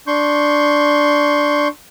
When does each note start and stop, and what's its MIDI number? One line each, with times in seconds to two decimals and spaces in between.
0.07 1.68 62
0.07 1.68 84
0.07 1.68 85
0.07 1.68 91